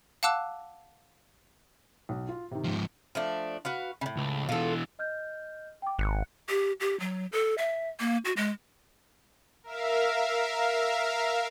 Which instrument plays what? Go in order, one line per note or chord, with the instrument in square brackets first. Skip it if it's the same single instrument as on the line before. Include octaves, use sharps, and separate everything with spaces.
[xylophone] F5 F#5 A5 D6 E6 F#6
[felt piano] B1
F4
C3 D#3
[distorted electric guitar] G#2 F3
[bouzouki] F3 A3 D4
F#4 B4 F5
A2 C#3
[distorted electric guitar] C#2
[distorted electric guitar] B2 E3 [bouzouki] F4 A4
[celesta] D#5 F6 G6
G5 D6
[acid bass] G#1 [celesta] F#6 C#7
[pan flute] G4
G4
F#3
A4
E5
A#3
F#4
G#3
[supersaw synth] A#4 E5 F5